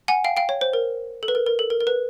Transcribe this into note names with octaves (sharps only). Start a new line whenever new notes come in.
F#5 G#5
F5 G5
F5 G5
C#5
C5
A#4
A4
B4
A#4
A#4
A4
A#4
A#4
B4